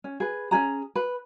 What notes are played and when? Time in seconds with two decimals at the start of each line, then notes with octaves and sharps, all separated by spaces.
0.04 C#4
0.20 G#4 B4
0.51 C#4 D#4 G#4 A#5
0.95 B4